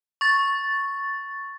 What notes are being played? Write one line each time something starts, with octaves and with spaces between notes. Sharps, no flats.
C#6 A6